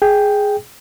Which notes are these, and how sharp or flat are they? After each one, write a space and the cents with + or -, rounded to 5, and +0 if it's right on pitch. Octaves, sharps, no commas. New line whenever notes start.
G#4 +0 G5 +0